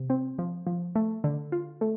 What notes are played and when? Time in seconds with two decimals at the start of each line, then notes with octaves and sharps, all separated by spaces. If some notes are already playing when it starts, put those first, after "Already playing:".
Already playing: C3
0.10 C4
0.39 F3
0.67 F3
0.95 A3
1.24 D3
1.52 F4
1.81 A3